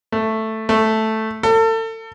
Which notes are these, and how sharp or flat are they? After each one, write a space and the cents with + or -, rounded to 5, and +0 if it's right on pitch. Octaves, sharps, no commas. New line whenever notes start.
A3 +5
A3 +0
A4 +35